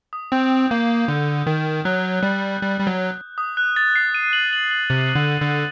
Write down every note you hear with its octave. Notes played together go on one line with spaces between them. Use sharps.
D#6
C4 G6
A#3 G6
D3
D#3
F#3 F#6
G3
G3
G3
F#3
D#6
F#6
A6
C7
D#7
F#7
F#7
F#7
C3
D3
D3